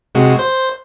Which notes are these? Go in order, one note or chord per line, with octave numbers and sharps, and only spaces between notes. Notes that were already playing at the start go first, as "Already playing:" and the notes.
C3 G#3 F#4
C5